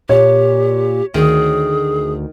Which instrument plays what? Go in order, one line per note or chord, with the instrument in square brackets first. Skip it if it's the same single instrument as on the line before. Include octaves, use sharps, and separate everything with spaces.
[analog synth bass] A#2 [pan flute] G4 [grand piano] C#5
[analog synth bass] D2 [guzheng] D#3 [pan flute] G#4